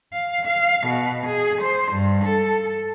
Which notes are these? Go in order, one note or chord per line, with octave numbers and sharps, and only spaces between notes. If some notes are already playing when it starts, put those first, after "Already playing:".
F5
F5
B2
G#4
C5
G2
A4